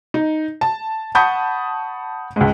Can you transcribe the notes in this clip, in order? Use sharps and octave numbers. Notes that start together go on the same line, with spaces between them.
D#4
A5
F#5 A5 B5 C#6 D#6 G6
C#2 G#2